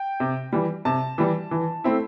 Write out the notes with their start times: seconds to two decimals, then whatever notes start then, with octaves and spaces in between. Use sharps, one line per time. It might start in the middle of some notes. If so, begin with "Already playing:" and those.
Already playing: G5
0.20 C3
0.53 E3 G3
0.85 C3 A5
1.18 E3 G3
1.51 E3
1.84 A3 C4 E4